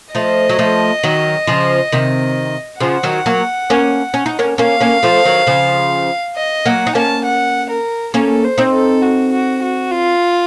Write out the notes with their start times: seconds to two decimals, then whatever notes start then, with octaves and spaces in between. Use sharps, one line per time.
0.15 F3 A3 D#5
0.49 F#3
0.59 F3 A3
1.03 D#3 F#3
1.47 C#3 F3
1.92 C3 D#3
2.80 C#3 F3 F#5
3.03 D#3 F#3
3.26 F#3 A#3
3.70 A#3 C#4
4.14 C#4
4.26 D#4
4.39 A#3 C#4
4.58 A#3 C#4 F5
4.81 A#3 C#4
5.03 F3 A3
5.25 D#3 F#3
5.47 C#3 F3
6.36 D#5
6.66 F#3 A#3 F#5
6.87 D#4
6.95 A#3 C#4 A5
7.25 F#5
7.69 A#4
8.14 A#3 C#4 A4
8.44 C5
8.58 C4 D#4
8.73 A4
9.02 F#4
9.32 F#4
9.62 F#4
9.91 F4